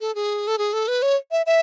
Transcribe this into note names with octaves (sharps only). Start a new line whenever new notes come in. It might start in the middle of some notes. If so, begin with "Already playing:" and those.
A4
G#4
A4
G#4
A4
B4
C#5
E5
E5